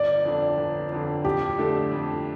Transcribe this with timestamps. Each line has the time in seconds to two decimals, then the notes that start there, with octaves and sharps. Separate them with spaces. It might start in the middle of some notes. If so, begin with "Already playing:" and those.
Already playing: G1 D5
0.25 F2 D3
0.58 G1
0.92 F2 D3
1.25 F2 G4
1.58 D3 A3 D4 A4
1.91 F2